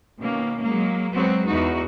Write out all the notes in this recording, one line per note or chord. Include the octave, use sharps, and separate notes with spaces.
B2 D#3 A#3 C#4
F#3 G#3 A#3
F#3 G#3 B3 C4 F#4
E2 D#4 F#4